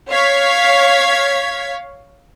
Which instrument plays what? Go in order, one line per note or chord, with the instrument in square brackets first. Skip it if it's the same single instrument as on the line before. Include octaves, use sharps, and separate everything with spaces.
[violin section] C#5 F5 G#6 B6